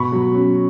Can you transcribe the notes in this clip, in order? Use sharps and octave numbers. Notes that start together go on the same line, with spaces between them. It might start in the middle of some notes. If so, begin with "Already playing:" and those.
Already playing: B2 B5 C#6
F#3
C#4